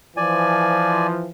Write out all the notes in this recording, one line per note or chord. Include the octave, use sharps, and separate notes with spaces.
E3 F3 D5 G#5